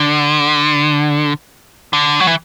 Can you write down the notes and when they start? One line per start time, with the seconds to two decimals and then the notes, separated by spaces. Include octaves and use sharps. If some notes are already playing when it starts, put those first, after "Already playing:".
Already playing: D3
1.93 D3
2.20 F#3
2.27 E3